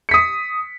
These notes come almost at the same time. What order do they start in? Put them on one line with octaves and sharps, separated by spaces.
C#7 B6 D#6